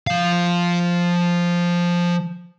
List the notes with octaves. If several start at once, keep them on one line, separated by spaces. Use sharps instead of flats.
F3 F5